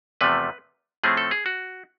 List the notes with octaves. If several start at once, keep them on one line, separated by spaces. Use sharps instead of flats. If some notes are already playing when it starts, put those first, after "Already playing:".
E2 C3 F3 A3 B4
A2 F3 A3 C4 G#4
A4
G#4
F#4